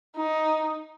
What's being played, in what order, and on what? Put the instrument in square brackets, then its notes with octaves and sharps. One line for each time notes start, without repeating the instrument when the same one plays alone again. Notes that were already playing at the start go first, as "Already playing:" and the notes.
[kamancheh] D#4